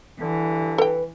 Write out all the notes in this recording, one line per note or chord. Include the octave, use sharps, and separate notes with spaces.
G2 D3 E3
A4 B4 G5